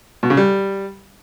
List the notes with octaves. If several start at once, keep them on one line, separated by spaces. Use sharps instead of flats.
B2
C#3
G3